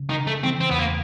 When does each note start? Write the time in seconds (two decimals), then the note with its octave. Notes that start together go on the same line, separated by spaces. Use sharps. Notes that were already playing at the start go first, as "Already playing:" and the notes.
Already playing: C#3
0.09 D#3
0.19 C#3
0.27 A3
0.44 E3 C4
0.61 C4
0.70 E2 B3
0.79 A#3